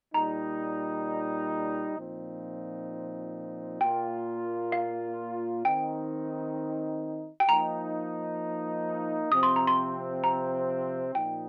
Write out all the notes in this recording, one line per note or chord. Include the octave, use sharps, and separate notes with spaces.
A#2 G3 D#4 A#5
A#2 F3 C4 D#4
A#2 A#3 F4 G5
F5
D#3 C4 D#4 G5
G5
F3 A#3 D#4 A#5
C3 F3 C4 D#6
C6
A#5
C6
A#5
A#2 F3 D#4 G5